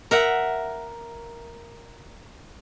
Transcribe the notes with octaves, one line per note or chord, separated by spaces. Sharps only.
A#4 E5 F#5